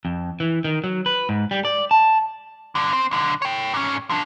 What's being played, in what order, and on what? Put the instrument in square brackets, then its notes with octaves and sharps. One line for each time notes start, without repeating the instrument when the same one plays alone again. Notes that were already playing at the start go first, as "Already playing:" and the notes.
[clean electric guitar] F2
E3
D#3
F#3
B4
G#2
G3
D5
A5
[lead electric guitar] G2 D3
C4
B1 D3
C#5 G5
G#2 C#4
F3 D4